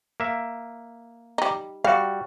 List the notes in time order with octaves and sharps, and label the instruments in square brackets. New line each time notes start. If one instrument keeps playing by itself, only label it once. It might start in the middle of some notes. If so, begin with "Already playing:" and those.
[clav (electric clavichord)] A#3 E5
[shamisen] G3 D#4
[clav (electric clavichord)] G3 F#4 [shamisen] F5